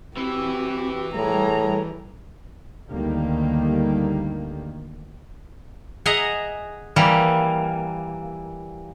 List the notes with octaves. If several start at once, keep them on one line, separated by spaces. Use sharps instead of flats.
E3 C4 E4 F#4 G4
A2 G3 G#4 A#5
D2 D#3 G3 A#3
G#4 D#5 E5 F#5 G#5 A#5
E3 G3 A#3